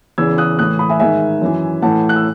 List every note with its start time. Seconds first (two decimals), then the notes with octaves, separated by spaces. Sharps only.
0.18 E2 C#3 E3 E6 G#6
0.38 D#6 F#6
0.58 A2 E3 D#6 F#6
0.79 B5 D#6
0.89 E5 G#5
1.00 G#2 D#3 E5 G#5
1.41 F#2 E3
1.82 A2 E3 F#5 A5
2.09 F#6
2.16 E6